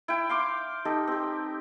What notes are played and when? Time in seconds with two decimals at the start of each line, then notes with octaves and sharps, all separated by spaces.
0.08 E4 G5
0.29 F5 C6 D6
0.85 D#4 G4 A4
1.07 C4 G4